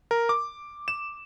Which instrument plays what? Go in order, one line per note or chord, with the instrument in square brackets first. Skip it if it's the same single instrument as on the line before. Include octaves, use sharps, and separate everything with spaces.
[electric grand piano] A#4
D6
E7